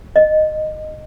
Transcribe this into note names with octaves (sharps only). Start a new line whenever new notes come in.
D#5